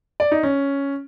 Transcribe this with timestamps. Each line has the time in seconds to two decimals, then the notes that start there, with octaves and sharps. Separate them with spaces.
0.20 D5
0.32 D#4
0.43 C#4